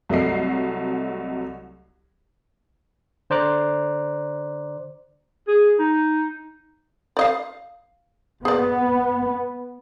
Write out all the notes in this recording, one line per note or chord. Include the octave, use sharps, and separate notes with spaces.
C2 F#3 A3 D#5 C7
D3 C5 D5 A#5 D6 F#6
G#4
D#4
D5 D#5 F5
B3 G#4 D5